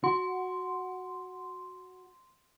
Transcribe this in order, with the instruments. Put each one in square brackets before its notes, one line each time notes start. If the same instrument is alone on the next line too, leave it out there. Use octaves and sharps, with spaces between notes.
[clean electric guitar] F#4 [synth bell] C6